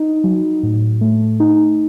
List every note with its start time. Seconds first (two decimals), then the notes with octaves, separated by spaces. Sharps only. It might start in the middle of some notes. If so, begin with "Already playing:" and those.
Already playing: D#4
0.24 F#3
0.63 A2
1.01 A3
1.40 D#4